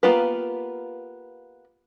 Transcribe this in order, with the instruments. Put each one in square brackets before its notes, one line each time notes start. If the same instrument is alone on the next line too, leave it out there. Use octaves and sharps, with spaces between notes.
[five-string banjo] A#3 B3 F4 G4 B4